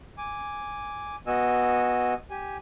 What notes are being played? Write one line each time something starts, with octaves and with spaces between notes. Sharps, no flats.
G#5 D6
B3 F#4 D#5 G#5 E6
G4 G#5